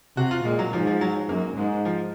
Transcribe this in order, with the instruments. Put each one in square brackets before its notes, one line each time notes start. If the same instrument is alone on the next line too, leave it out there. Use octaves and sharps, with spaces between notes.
[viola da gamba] C3 [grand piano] F#4
[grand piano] F4
[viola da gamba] A#2 [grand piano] G#3
[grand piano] F#3
[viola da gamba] G#2 [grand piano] F3
[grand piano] F3
F#3
[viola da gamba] F#2 [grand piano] A#3
[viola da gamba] G#2 [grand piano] G#3
[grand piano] F3